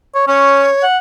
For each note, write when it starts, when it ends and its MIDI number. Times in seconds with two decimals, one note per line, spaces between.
0.15 0.23 73
0.28 0.67 61
0.28 0.84 73
0.83 0.98 78